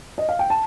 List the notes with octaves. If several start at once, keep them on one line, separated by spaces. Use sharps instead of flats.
D#5
F5
G5
A5